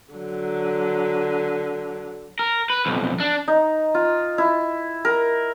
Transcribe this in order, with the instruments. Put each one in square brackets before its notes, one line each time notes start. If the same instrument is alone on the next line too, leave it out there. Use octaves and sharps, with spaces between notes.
[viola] D3 F#3
[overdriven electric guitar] A#4
B4
B1 F2
D4
[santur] D#4
F4
E4
A#4